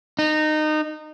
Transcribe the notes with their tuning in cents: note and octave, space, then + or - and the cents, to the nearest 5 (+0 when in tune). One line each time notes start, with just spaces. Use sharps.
D#4 -20